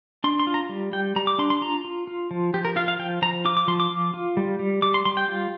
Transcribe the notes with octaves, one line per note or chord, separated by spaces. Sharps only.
D4 C6
C6
F4
A#5
G3
G3 G5
G3 A#5
D6
D4 C6
C6
F4 A#5
F4
F4
F3
F3 G4
A#4
F4 F5
F5
F3 G5
F3 A#5
F4 D6
D6
F3 C6
D6
F4
F4
G3
G3
G3 D6
C6
G3 C6
G5
F4